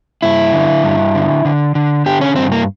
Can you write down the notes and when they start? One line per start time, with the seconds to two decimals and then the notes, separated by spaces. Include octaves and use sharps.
0.22 G2 E4
0.53 D3
0.83 G2
1.15 D3
1.45 D3
1.75 D3
2.06 D3 G4
2.21 C#4
2.36 G2 C4
2.52 A#3